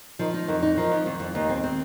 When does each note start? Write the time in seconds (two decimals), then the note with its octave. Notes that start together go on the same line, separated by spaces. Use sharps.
0.19 D#3 F3
0.34 D#4
0.48 F2 D#3
0.63 D#4
0.77 D#3 F3
0.92 F2
1.06 F2
1.20 F2
1.35 D#2 D#3
1.49 C4
1.64 C4